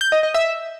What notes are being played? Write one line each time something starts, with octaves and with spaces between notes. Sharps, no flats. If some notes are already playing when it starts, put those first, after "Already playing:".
G6
D#5
D#5
E5